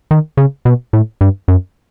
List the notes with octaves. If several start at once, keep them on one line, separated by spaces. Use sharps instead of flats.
D#3
C#3
B2
A2
G2
F#2